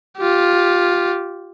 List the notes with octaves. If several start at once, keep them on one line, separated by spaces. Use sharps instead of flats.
F4 G4